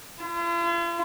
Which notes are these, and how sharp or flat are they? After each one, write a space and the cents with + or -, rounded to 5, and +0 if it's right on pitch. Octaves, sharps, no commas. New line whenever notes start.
F4 -45